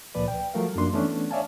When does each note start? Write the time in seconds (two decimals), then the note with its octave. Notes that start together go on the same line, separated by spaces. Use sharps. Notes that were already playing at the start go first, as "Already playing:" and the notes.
0.15 C#2 A#2 F3 B4 D5
0.28 G5
0.54 F3 F#3 A3 A#4 F5
0.76 F#2 F3 A#3 D4 C6
0.93 E3 A3 B3 C#4 D4
1.31 C#5 D5 E5 F5 G#5 A5